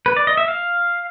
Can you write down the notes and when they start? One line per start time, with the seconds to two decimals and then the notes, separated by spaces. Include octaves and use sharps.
0.06 B4
0.17 D5
0.27 D#5
0.37 E5
0.48 F5